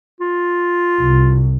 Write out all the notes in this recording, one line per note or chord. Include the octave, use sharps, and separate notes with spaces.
F4
C2